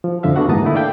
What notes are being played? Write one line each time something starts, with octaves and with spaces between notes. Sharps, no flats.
F3
F2 D3 F3 E5 F5
A3 B3 D4 F#4 F#5
G#2 E3 A#3 A5 A#5 D#6
D3 D#3 A3 E4
D5 E5 F5 G5